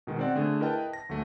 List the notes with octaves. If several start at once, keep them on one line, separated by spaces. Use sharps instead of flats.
B2 D#3 G#3
C4 D5 F#5
D3 A3 G#4
E4 A#4 B4 D#5 G5 A5
A#6
D2 F#3 A3